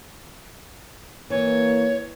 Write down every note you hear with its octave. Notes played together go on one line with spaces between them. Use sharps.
E3 A#3 C#5